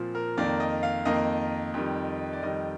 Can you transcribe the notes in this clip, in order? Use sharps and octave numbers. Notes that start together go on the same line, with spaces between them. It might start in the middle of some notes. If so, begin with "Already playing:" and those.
Already playing: A#2 F3 C4
A#4
F2 D#3 A#3 D5
D#5
F5
F2 D#3 A#3 D#5
F2 D#3 G3
D5
F2 D#3 G3 D#5